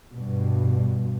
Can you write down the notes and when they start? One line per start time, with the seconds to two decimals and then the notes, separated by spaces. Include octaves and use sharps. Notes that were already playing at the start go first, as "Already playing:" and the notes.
0.13 G2 B2